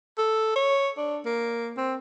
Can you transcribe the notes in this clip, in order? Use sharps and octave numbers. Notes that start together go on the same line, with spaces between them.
A4
C#5
D4
A#3
C4